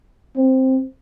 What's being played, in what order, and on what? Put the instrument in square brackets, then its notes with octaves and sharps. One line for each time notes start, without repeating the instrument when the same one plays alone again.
[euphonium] C4